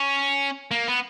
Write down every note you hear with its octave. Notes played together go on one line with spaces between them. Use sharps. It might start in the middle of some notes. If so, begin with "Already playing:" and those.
Already playing: C#4
A#3
B3